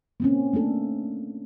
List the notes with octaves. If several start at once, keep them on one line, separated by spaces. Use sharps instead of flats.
A#3 C4 C#4
A3 A#3 D4 A4